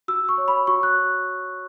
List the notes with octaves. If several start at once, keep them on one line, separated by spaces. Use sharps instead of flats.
F#4 E6
C#6
C#5
B5
F#4 C#6
F#6